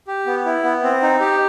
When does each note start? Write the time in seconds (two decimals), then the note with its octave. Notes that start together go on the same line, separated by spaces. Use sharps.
0.07 G4
0.26 B3
0.45 E4
0.64 B3
0.83 C4
1.02 D#4
1.20 G4